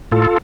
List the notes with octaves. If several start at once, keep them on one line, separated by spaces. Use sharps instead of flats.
A2 F4 A4